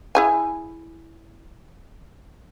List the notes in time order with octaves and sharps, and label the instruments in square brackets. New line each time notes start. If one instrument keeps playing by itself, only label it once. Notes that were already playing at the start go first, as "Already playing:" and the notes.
[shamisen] E4 G#4 G#5